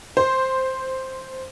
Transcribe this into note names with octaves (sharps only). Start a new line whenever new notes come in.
C5